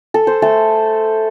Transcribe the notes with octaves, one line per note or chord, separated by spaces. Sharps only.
A4
C5
A3 A4